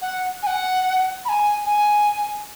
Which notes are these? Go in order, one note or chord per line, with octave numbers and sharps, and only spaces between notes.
F#5
G#5
F#5
B5
G#5
G#5